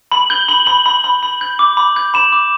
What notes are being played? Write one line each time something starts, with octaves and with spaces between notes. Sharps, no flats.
B5 F#7
G6 G7
B5 F#7
B5 F#7
B5
B5
B5
G6
D6
B5
G6
B5 E7
D6